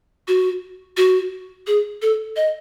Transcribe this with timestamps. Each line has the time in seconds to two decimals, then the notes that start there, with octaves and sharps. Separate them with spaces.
0.28 F#4
0.97 F#4
1.67 G#4
2.02 A4
2.36 D#5